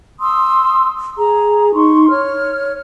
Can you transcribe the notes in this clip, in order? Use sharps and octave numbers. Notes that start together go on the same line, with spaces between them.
C6 D#6 E6
G#4 A#5
D#4 C6 C#6
C#5 F6